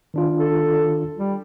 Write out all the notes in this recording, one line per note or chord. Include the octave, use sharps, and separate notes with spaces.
D#3 D4 F4
A4
G3